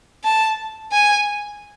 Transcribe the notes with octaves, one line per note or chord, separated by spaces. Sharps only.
A5
G#5